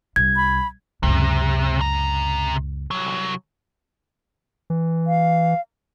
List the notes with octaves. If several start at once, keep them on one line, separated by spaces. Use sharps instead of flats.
C2 G#6
B5
C#2 F#2 C3
C3 A#5
C2 F#3
E3
F5